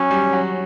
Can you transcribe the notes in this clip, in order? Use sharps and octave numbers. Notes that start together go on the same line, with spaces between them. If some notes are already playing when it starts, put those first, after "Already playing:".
Already playing: F#3 C#4
G3
F#3